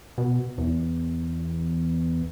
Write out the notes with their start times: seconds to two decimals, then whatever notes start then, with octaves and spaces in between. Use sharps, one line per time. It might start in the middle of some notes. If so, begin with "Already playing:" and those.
0.18 B2
0.58 E2